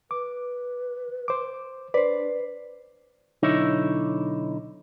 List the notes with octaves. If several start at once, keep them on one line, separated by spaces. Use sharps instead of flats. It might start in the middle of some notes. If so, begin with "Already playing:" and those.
B4 D6
C5 D6
D4 B4 C5 D5
B1 D3 D#4 E4 C#5